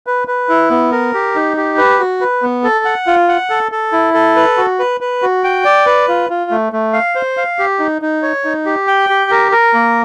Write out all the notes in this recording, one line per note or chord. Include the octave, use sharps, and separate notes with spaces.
B4
B4
E4
B3
A#4
G4
D#4
G4
B4
F#4
B4
B3
A4
F#5
F4
F#5
A4
A4
E4
A4
B4
F#4
B4
B4
F#4
G5
D5
B4
F4
F4
A3
A3
F5
C5
F5
G4
D#4
D#4
C#5
D#4
G4
G5
G4
A#4
A#4
A#3